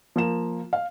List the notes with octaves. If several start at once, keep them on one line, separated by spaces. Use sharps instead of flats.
F3 A#3 E7
F5